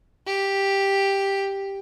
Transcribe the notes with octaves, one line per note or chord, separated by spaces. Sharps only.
G4